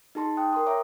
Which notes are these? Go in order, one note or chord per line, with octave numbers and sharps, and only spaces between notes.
D#4 G#4 A5 C6
G5 D#6 F#6
A#4 C6 D#6
C#5 E5 A#5 D6